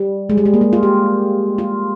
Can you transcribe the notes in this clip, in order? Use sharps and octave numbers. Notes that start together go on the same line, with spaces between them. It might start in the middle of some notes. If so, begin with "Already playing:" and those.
Already playing: G3
G#3
G3
G#3
A#3
G#3
F4
G4
F4